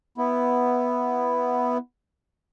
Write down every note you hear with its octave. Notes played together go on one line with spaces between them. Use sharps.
B3 E4